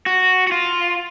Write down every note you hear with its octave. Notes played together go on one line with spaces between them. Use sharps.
F#4
F#4
F4